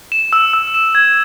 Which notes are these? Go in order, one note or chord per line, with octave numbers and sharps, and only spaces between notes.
E7
E6
E6
E7
G#6